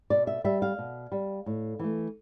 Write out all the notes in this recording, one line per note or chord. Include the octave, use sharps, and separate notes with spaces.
B2 D5
E5
G3 E5
F5
B2
G3
A2
E3 A3